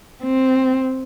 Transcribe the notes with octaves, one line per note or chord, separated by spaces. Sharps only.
C4